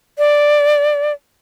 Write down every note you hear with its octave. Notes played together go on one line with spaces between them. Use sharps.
D5